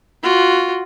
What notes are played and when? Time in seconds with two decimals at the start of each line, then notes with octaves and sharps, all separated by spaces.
0.23 F4 F#4